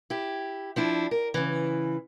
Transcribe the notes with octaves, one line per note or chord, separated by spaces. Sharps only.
E4 G4
F3 D4 E4
A#4
C#3 E3